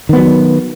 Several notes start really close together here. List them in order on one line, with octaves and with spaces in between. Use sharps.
D#3 B3 F#3